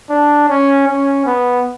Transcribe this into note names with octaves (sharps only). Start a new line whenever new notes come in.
D4
C#4
C#4
B3